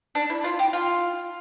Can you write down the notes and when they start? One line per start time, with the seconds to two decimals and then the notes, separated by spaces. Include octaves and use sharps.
0.15 D4
0.30 E4
0.44 F4
0.59 G4
0.73 F4